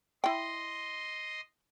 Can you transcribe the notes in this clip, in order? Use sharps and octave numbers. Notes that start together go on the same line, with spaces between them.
E4 D#5 G5 C6